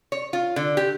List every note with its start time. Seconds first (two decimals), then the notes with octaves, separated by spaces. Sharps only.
0.12 C#5
0.33 F4
0.56 D3
0.77 G4